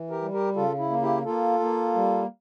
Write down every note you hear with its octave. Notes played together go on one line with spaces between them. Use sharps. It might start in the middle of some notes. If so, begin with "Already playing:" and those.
Already playing: E3
G4 A#4
G3
G4 A#4
C#3 F4 A4
E4
A#3
E4 G4
A#3 F4 A4
A#3
G3